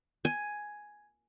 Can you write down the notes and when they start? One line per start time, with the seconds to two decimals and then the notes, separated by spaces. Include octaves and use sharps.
0.25 G#5